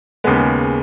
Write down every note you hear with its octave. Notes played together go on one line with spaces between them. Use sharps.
D#2 C#3 G#3 B3